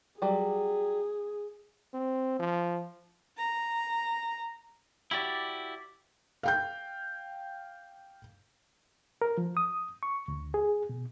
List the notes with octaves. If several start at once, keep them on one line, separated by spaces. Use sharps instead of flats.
F#3 G3 G#4
C4
F3
A#5
E4 F#4 G4 D5
F5 G5 G6
A#4
F3
D#6
C#6
D2
G#4
B2